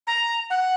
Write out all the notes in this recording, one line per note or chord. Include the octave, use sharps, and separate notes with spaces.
A#5
F#5